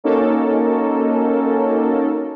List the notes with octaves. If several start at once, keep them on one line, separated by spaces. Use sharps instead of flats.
A#3 C#4 D#4 F#4 A4 A#4